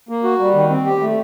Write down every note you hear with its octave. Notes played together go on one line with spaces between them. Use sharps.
A#3
F#4
G3
D#3
C4
G4
A3